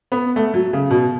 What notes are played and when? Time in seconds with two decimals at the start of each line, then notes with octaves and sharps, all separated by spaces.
0.12 B3
0.36 A3
0.54 F#3
0.73 C#3
0.90 B2